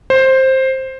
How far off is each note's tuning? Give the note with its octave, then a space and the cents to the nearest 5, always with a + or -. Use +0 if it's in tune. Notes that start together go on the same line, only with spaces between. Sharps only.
C5 +10